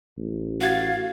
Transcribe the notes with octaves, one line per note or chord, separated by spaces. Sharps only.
A1
F#4 F5 G#6 A6